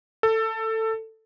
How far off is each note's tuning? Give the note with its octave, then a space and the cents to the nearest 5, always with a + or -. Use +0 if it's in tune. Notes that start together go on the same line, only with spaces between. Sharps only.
A4 +15